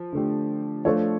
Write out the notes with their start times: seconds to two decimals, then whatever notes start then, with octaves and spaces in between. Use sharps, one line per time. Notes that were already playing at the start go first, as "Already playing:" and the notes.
Already playing: F3
0.13 D3 A3 D4 G4
0.85 F3 A3 D4 F4 A4 C#5